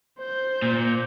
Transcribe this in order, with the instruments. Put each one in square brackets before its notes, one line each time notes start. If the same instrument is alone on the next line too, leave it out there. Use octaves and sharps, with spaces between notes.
[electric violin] C5 G6
[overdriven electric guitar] A#2